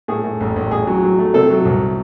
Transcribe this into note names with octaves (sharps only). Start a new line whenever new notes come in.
A2 G#4
A2
A1
A1
A1 G#4
F#3
F#3
A3
C3 A4
F#3
C2